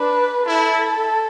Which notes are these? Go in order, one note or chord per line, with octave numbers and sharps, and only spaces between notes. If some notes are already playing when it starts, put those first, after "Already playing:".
Already playing: D4 B4
E4 A4